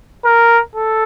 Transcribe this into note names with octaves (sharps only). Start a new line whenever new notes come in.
A#4
A4